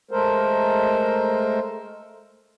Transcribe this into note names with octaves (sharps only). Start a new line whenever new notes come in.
G#3 A3 A4 A#4 C5